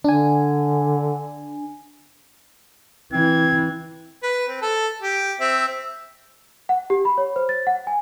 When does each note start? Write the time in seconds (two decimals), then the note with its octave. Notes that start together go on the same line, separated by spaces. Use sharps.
0.04 D3 D4 G#5
3.13 E3 C4 G#6
4.23 B4
4.48 C4
4.62 A4
5.02 G4
5.40 C4 E5
6.69 F#5
6.90 G4
7.05 B5
7.18 C#5
7.36 C5
7.49 A6
7.67 F#5
7.87 G#5